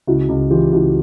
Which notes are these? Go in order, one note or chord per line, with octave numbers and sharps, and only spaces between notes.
C#2 E4 F#4
C#2
E3 F4 G4
C#2 E4 F#4